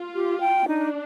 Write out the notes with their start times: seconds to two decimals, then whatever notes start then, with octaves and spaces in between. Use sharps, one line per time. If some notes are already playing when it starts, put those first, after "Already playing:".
Already playing: F4
0.15 G4
0.40 G5
0.67 D4 D#4